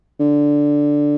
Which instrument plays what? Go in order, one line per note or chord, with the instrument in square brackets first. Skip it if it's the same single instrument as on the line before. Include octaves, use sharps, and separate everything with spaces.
[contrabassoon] D3